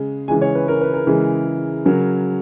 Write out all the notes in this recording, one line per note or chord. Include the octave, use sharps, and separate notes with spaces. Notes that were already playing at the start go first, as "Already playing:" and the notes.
Already playing: C#3 G#3
C#3 E3 G#3 G#5
C#5
B4
A#4
B4
A#4
C#3 E3 G#3
C#3 F#3 A#4